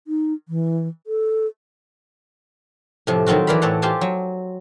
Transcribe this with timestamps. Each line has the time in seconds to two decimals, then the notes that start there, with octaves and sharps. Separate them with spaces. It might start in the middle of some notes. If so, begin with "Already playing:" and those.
0.07 D#4
0.48 E3
1.07 A4
3.07 A2 C3 F3
3.26 D#3 F#3 C4 F4 F#4
3.47 E3 A#4 D5 F5 B5
3.62 A2 C4 A4 C#5 D5 F#5
3.82 C4 F4 G4 C5 G#5 A5
4.01 F#3